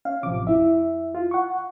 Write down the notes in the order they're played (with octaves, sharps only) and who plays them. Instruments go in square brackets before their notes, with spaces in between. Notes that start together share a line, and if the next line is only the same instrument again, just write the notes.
[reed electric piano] C#4 [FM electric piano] F5
[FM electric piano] A1 D6 [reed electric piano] C3 F3
[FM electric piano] F2 E4 [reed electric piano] E5
[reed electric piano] F4
F#5 C#6